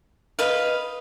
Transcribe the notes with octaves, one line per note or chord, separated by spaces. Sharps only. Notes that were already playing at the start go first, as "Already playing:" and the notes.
B4 D#5 F5